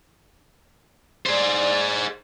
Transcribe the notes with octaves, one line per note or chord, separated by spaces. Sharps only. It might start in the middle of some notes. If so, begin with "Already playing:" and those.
G#4 C5 D5